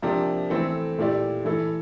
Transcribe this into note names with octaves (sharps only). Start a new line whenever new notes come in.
C3 F3 A#3 D4 G4
E3 A3 C4 E4 A4
A#2 A3 E4 G4 D5
E3 A3 E4 A4